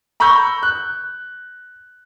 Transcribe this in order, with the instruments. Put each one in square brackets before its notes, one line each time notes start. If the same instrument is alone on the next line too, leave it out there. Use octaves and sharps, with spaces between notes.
[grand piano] A#5 B5 C#6 E6 G6
F#6